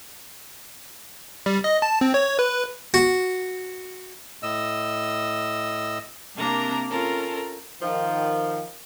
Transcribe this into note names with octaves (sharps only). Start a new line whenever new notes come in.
G3
D#5
A5
C4
C#5
B4
F#4
A2 D#5 E6
C3 A#3 C4 D4 A#4 A#5
C#4 F4 A4 A#4
D#3 F3